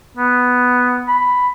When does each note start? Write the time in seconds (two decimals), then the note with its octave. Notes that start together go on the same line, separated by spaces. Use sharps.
0.17 B3
1.08 B5